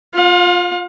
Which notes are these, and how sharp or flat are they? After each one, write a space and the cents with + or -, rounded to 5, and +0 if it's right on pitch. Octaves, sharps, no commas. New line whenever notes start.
F4 +10 F5 +40